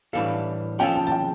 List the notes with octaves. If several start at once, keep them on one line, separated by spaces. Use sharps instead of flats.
A2 E3 G3 D4 A4 F5
F3 C#4 F4 A4 G5
A5
A5
G5